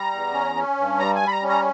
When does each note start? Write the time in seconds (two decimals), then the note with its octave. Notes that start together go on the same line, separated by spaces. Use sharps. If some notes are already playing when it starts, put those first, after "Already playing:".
Already playing: G3 A#5
0.12 E2
0.33 C#4
0.55 C#4
0.78 G2
0.99 G3 A#5
1.15 G#5
1.22 G3
1.27 B5
1.32 A#5
1.43 C#4
1.49 A#5